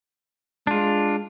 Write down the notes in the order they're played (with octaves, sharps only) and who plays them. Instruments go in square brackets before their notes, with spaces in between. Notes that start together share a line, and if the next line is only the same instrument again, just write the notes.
[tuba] G#3 [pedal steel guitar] D4 F4